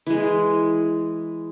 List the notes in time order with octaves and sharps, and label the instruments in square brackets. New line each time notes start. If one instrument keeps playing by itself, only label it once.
[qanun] E3 G#3